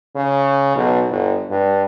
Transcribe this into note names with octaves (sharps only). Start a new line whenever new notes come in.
C#3
B1
G1
G2